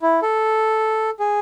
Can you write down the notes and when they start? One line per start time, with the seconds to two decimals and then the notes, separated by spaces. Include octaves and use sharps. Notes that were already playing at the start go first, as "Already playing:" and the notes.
0.02 E4
0.22 A4
1.20 G#4